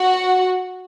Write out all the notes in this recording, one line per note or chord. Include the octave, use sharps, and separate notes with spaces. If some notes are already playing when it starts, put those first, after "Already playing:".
Already playing: F#4 F#5